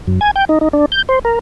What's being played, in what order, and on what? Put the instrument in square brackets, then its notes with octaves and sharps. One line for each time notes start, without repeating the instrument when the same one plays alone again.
[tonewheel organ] F#2
G#5
G5
D#4
D#4
D4
G6
C5
A#4